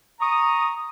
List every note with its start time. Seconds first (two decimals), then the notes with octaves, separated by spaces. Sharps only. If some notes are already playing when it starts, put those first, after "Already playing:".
0.21 A#5 C#6 D#6